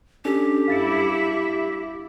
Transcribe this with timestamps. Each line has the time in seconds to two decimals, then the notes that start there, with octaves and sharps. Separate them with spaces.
0.25 C#4 D4 G4 A4
0.68 G2 E4 E5 F5 A6 C#7